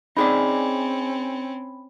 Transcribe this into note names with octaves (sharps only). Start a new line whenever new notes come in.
C4 C#4 D#4 G#4 D5 B5